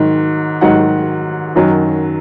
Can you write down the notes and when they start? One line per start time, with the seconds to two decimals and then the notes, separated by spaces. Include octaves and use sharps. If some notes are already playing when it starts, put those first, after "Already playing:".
Already playing: G#2 D#3 F#3
0.61 G#2 D#3 F#3 F#5
1.55 F#2 D#3 F#3